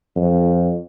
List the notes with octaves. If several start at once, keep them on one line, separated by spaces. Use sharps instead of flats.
F2